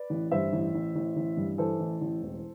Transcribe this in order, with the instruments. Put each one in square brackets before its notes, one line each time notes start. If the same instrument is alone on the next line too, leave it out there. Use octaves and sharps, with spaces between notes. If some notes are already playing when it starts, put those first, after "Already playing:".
Already playing: [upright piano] B4 D5
A1
G2 C5 E5
A1
A1
A1
A1
G2
E3 A4 C5
A1
A1
E1